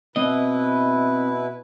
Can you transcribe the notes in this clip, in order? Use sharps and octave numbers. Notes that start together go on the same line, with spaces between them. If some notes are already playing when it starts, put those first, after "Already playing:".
B2 C4 E4 B4 D#5